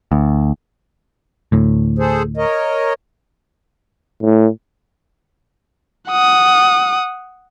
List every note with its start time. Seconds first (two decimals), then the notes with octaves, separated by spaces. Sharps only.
0.12 D2
1.52 D2 A2
1.98 G#4 A4 C5
2.37 A#4 C#5 D#5
4.22 A2
6.09 F#5 D#6